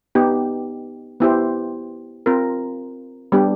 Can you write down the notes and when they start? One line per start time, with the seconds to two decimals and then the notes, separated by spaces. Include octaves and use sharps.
0.15 B3 D#4 G4
1.20 B3 E4 G4 C5
2.26 C4 F4 A#4
3.32 G3 B3 D4 G4